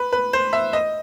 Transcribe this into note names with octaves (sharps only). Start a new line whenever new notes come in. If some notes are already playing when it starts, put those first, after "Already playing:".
Already playing: B4
B4
C5
E5
D#5